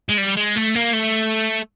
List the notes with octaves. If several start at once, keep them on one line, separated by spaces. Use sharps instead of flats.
G#3
G3
G#3
A3
A#3
A3